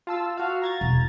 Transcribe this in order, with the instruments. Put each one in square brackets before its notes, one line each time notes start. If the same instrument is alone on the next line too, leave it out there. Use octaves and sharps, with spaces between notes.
[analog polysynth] F4 A5 E6
F#4 F5
A#5 G#6 A6
[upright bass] E1